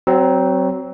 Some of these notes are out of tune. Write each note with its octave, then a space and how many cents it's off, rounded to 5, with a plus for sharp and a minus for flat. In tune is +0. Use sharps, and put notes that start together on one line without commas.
F#3 +25 C4 -5